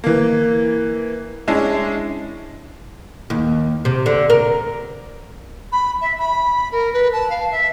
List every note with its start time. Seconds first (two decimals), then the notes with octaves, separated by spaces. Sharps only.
0.04 E3 A#3
1.48 G#3 C#4 D4 E4
3.30 D#2
3.85 C3
4.06 D3
4.30 A#4
5.72 B5
6.01 E5
6.18 B5
6.72 A#4
6.93 B4
7.12 A5
7.30 F5
7.51 E5